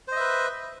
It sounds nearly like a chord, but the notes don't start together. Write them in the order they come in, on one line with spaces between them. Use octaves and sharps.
C5 D#5 E5 B4